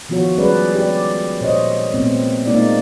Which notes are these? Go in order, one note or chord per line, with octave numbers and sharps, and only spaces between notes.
D#3 F3 B3 F4 F#4 C#5
G3 G#3 C#4 G#4 B4 D5
G4 D5
A#2 C5 C#5 D#5
A#2 A3 B3 C4
G#3 A#3 B3 D#4 F4 D5